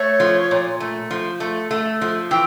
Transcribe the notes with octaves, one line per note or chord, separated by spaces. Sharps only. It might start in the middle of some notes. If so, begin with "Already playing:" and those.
Already playing: A3 C#5
F3
A#2
A3
F3
A3
A3
F3
E3 G5